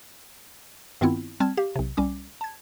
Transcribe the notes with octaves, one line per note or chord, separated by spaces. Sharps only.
G2 D#3 B3 C4 E4 F4
G3 C4 A5 F6 G#6
G4 F5
B1 C3
C2 G3 C#4 D6
A5 G#6